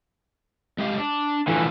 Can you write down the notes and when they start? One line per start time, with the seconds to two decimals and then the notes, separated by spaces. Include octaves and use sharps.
0.78 G#3 G4 F5
0.98 D4
1.47 A#2 D3 E3 F3 A3